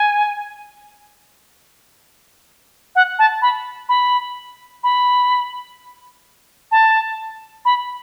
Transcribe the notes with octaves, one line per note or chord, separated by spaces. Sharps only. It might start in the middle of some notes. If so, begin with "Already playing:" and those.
Already playing: G#5
F#5
A5
B5
B5
B5
A5
B5